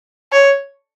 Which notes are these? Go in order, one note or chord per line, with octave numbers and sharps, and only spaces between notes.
C#5